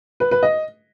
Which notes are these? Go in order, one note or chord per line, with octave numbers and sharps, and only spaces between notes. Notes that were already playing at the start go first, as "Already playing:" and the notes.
B4
B4
D#5